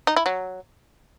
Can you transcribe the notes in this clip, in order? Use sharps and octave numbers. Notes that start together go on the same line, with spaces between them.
D#4
E4
F#3